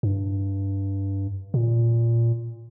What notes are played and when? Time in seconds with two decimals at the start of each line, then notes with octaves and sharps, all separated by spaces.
0.03 G2
1.54 A#2